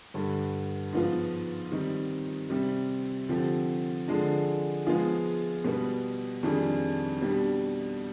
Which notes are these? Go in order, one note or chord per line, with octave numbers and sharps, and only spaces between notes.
G2 D3 G3
G#2 F3 B3 F4
D#3 G3 C4 D#4
C3 G3 C4 G4
D3 F3 C4 G4
D3 F3 G#3 D4
F3 G#3 B3 F4 G#4
B2 G3 B3
F2 D#3 G3 D4 G#4
B2 G3 D4 G4